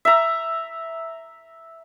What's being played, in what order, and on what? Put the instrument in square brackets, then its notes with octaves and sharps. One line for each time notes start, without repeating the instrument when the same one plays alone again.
[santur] E5 A#5